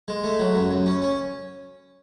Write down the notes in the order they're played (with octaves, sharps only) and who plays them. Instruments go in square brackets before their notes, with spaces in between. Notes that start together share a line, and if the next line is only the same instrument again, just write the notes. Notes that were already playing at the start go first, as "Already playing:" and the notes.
[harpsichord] G#3
A3
F#3
F#2
F#2
C#4
C#4